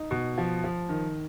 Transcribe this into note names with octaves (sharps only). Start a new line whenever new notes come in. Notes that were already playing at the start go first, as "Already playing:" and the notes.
Already playing: D#4
B2
F3
F3
D#3